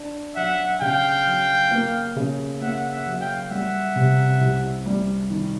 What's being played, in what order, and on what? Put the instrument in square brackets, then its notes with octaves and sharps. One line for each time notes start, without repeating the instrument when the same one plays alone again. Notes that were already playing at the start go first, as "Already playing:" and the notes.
Already playing: [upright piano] D4
[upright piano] F#3 [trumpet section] E5 F#5
[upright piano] C#3 [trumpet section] F5 G5
[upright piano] F#3
A#3
C#3
[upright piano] A#3 [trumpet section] E5 F#5
[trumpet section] E5 F#5
[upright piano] F#3
[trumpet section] F5 G5
[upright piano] G3 [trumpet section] E5 F#5
[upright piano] C3
C2
G3
D#3